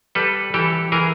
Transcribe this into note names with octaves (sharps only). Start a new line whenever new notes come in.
G3 A4 B4
E3 G4 A4
E3 G#4 A#4